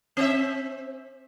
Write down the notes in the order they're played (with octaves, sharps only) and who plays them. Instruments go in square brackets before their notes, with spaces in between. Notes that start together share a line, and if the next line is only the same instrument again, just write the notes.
[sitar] C4 E5